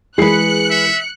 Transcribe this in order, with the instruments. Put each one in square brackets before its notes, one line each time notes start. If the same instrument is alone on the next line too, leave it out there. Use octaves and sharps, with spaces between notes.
[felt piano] E3 G#3 C7 [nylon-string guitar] G#4 B4 [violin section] F#6 C#7
[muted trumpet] E5